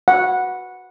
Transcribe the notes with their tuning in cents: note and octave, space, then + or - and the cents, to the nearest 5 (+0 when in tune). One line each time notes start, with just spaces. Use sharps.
F#5 -10